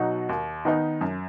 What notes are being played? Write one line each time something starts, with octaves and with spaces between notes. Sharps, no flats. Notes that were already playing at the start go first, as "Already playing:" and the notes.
Already playing: B2 F#3 D#4 F#4
D#2
D#3 B3 D#4
F#2